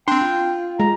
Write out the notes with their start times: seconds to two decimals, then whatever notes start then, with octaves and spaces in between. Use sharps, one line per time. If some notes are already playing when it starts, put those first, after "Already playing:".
0.08 C4 D4 G5 C6
0.21 F4
0.80 G#3 A#5